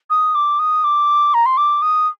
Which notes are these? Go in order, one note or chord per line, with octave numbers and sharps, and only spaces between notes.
D#6
D6
D#6
D6
A#5
C6
D6
D#6